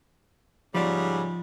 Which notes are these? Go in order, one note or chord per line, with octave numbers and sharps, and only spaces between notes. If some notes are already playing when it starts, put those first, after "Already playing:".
G#2 C#3 F3 G3 D5